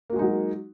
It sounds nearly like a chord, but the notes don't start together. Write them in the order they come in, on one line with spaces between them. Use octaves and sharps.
A#3 F#4 G#3 D#4 F#3